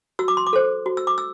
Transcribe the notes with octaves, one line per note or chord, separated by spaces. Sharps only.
F#4 E6
D6
C6
D6
A4 C5
F#4
E6
D6
E6